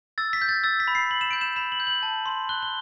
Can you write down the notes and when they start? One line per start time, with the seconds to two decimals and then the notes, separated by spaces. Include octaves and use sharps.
0.18 E6 A6
0.33 B6
0.42 G6
0.49 A6
0.64 E6 A6
0.80 B6
0.88 B5
0.95 C7
1.10 B5 F#7
1.21 E7
1.31 G6 D7
1.41 E7
1.56 B5 E7
1.72 F#7
1.80 G6
1.87 F#7
2.03 A5
2.26 C6
2.49 F#6 G7
2.63 G7